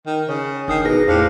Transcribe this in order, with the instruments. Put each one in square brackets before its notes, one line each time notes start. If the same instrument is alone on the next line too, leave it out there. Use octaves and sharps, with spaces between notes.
[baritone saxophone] D#3
[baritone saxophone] C#3 [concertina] G#4 [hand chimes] C#5
[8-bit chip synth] G1 D#6 C7 [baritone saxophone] D#3 [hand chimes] D4
[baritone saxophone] B2 [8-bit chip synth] D#4 B4 A#6 [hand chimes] G#4
[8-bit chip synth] E2 [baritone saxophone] A2 [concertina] D4 G4 F5 [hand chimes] C5 C#7